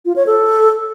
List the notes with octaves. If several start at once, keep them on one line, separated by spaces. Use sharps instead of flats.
F4
C#5
A4